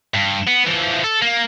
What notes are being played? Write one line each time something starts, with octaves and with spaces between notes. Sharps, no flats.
G2
B3
E3 F3
A4
A#3